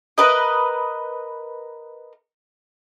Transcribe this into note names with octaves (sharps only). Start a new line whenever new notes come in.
A#4 B4 D#5